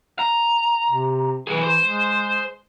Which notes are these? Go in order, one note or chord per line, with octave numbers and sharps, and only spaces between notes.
A#5
C3
B1 E3 G#4
C5 C6
G#3